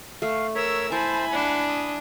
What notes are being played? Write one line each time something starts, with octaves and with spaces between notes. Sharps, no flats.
A3 F5
A#4 C#5 E5 E6
E4 C5 G#5 A5 B5
D4 F#5
D#6